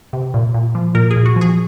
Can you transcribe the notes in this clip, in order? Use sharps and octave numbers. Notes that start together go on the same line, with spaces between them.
C3
A#2
A#2
F3
A#2 A#4
G#4
A#2
F#4
F3
G#4